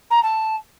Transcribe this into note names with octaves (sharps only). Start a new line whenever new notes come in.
A#5
A5